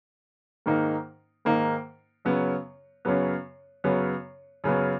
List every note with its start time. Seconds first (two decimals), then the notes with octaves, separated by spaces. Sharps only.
0.66 G#2 D#3 A#3 D#4
1.45 G#2 D#3 A#3 D#4
2.25 F#2 C#3 F#3 B3
3.05 F#2 C#3 F#3 B3
3.84 F#2 C#3 F#3 B3
4.64 F#2 C#3 F#3 B3